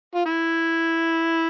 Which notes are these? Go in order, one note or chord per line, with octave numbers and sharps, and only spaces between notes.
F4
E4